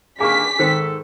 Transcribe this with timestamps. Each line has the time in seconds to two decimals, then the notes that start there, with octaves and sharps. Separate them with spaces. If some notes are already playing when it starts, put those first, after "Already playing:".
0.20 D3 D#3 A#3 G#4 G#5 C#6 D6 B6
0.59 G#2 D#3 A4 C5 G5